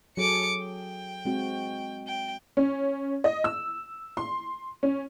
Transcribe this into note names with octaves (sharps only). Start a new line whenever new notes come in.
F#3 G#4 A4 D6 C#7
G5
G#3 C4 F#4
G5
C#4
D#5
E6
C6
C#4